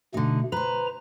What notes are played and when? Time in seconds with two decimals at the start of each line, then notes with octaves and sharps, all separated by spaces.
0.14 B2 D3 A3 D#4
0.52 B4 C5 A#5